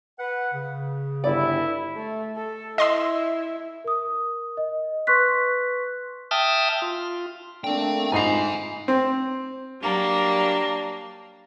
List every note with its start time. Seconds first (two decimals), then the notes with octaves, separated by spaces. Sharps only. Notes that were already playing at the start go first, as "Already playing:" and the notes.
0.18 B4 F#5
0.53 C#3
1.24 G1 E4 D5
1.96 A3
2.36 A4
2.78 E4 D#5 C6 E6
3.84 A#4 D#6
4.57 D#5
5.07 B4 C6 C#6 F#6 B6
6.31 E5 G5 A5 D#6 F6
6.82 F4
7.64 A3 A#3 C4 D4 G5
8.12 G#2 D#4 F4 G#5 B5 C7
8.88 C4
9.82 F#3 G3 A#3 D4